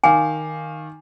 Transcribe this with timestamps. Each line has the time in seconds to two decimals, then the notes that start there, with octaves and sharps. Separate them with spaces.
0.04 D#3 F5 G#5 D6